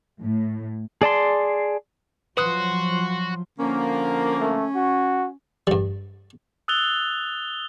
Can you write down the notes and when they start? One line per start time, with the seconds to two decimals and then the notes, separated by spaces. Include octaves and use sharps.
0.22 A2
1.02 G#4 D5 A5 C6
2.37 F3 F#3 F#4 B4 C6 D#6 F#6
3.59 D3 F3 A#3 C#4
4.40 A3
4.75 F#4
5.67 G2 G3
6.68 D#6 E6 F#6 A6 F7 G7